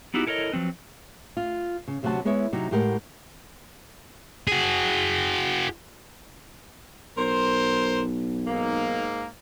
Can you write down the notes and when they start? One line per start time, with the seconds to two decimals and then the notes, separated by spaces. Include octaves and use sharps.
0.14 B3 D#4 E4 F#4 G4
0.27 E4 A4 A#4 C#5 D#5
0.52 F3 F#3 C4 B4
1.37 F4
1.88 C#3
2.03 D2 C3 F#3 F#4 F#5 A5
2.25 G#3 B3 E4 C#5 E5
2.52 C3 F#3 D#4
2.71 A2 G#3 G4 A#4 F#5 G5
4.48 F#4 G#4
7.17 B1 A#4 C5
8.47 G#2 A#3